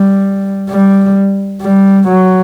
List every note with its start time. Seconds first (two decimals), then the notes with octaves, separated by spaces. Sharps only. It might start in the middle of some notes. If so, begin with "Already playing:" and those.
Already playing: G3
0.70 G3
1.62 G3
2.08 F#3